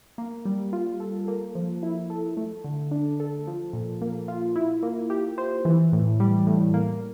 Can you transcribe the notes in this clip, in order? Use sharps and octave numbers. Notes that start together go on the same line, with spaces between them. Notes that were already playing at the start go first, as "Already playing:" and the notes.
A#3
G3
F4
A4
A#3
F3
E4
A4
A3
D3
D4
A4
F3
A#2
A#3
F4
E4
A#3
G4
C5
E3
A2
G3
A2
A#3